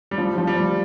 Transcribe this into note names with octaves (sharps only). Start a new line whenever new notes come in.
G3
F3
F3
G3